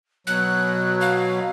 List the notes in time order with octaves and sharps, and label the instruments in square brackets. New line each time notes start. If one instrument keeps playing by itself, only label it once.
[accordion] B2 F#3 [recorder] F#6
[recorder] F5